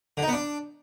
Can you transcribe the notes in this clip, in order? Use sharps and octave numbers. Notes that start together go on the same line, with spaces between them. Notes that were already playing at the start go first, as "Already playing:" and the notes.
D3
D#4
B3
D4